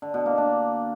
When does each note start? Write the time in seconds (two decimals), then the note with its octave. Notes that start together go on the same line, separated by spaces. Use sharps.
0.02 D3
0.14 B2
0.26 A#3
0.38 D4